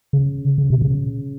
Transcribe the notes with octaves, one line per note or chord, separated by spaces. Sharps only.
C#3
C#3
B2
C#3